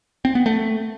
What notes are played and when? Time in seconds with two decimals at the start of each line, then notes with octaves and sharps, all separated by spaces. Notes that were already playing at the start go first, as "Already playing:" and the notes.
0.25 C4
0.35 B3
0.46 A3